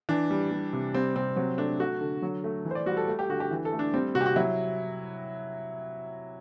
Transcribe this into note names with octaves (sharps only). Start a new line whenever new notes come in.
E3 D4
G3
G3
C3
G3 C4
C3 C4
F#3 C4
A3 D4
A3 F#4
D3
F#3
A3
E3
C5
D5
G3 F#4
A4
A3
G4
D3 F#4
G4
E3
A4
A3
D4
G3 C4
C3 F#4
G4
F#4
F#3 E4